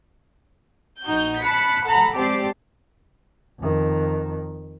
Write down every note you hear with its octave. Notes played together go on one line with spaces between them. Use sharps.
A#1 D#4 F#4 G6
A5 B5 F#6 B6 C#7
A4 F#5 A#5 B5
G#3 C4 G4 D5 A5 C7
F2 D#3